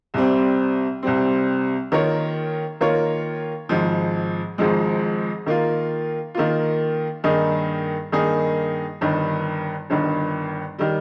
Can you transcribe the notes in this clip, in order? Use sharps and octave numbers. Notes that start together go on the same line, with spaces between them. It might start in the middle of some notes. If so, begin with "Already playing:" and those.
C2 C3 G3 C4
C2 C3 G3 C4
D#3 A#3 F4 A#4 C#5
D#3 A#3 F4 A#4 C#5
G#1 G#2 F3 G#3
G#1 G#2 F3 G#3
D#3 A#3 F4
D#3 A#3 F4
G2 D#3 A#3 D#4 G#4
G2 D#3 A#3 D#4 G#4
G1 G2 D#3
G1 G2 D#3
D#3 G3